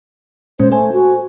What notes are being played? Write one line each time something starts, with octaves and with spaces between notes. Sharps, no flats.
A#2 G#3 C#4 C5
A3 A4 C5 G#5
F#4